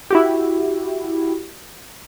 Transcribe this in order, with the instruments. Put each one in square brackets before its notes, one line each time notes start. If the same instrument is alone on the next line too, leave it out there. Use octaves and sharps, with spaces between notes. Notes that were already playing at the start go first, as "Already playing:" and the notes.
[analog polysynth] E4 F#4 G4